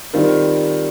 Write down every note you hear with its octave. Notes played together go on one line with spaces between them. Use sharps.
D#3 G3 C4 F4 A#4